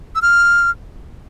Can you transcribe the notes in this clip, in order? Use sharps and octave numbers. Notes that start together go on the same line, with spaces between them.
E6
F6